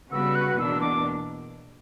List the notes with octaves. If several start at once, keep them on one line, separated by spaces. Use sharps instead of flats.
C#3 G3 B3 F#4 B4 E6
F#6
E2 B2 A#3 D4 E6
D6